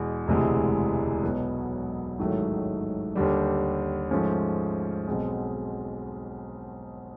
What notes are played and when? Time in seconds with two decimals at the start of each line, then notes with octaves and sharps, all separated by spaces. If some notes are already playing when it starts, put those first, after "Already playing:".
Already playing: E2 B2 G#3
0.27 E1 D2 C3 E3 G#3
1.23 B1 B2 F#3 B3
2.19 A1 G#2 D#3 F#3 A3
3.15 D#2 D3 G3
4.11 G#2 F3 A3 C#4
5.07 B1 B2 G#3 C4